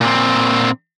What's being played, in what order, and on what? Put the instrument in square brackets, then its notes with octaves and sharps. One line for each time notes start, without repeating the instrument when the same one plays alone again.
[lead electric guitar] A#2 C4